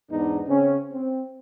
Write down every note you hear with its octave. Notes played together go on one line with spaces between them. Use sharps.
E2 G#2 B3 D4 D#4
C#3 C4 C#4
C4